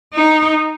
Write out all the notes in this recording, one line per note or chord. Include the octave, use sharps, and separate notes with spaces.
D#4